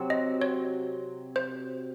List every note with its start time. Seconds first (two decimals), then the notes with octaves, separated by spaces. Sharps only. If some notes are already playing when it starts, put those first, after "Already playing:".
Already playing: C3 F#3 C4
0.10 D#5
0.42 C#5
1.36 C5